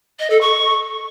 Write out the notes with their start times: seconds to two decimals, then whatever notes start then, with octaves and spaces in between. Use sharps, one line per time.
0.19 D#5
0.30 A4
0.41 C#6